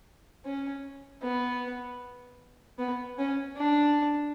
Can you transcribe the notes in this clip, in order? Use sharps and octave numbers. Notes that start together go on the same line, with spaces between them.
C#4
B3
B3
C#4
D4